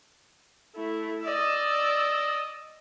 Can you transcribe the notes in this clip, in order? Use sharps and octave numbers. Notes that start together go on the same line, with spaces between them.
A3 E4
D5 D#5 E6